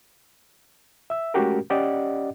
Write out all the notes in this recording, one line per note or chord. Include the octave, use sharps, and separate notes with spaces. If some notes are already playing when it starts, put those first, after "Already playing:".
E5 E6
G#3 A3 C#4 F#4 G4 A#4
C#4 G4 D5 D#5 F#5